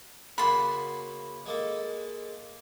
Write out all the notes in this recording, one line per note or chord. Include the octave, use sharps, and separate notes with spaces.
C#3 A#3 F#4 B5 C6
G#3 A#3 A4